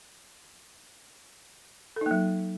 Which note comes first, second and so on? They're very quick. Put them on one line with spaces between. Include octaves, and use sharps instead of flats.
A4 D#4 A#3 F#3